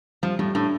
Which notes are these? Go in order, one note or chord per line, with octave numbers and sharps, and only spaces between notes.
F3 G3
A2 G3
A2 D4